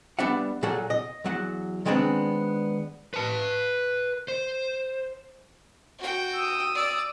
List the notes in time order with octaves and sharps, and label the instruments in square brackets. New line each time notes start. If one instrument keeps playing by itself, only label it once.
[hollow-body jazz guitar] G3 B3 D4 E5 F#5
A#2 F#3 G#4 A4 F#5
D#5
E2 F#3 F#5
D#3 G#3 B3 C4 D4
[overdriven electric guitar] B4 A5
C5
[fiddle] F#4 G5
[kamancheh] D#6 E6
[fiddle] D5